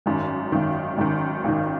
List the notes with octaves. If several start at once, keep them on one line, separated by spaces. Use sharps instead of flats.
G#1 F#2 D#3
G#1 F#2 D#3
G#1 F#2 D#3
G#1 F#2 D#3